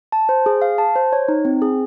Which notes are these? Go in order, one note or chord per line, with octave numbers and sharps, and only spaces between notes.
A5
C5
G#4
F5
A5
C5
C#5
D#4
C4
G#4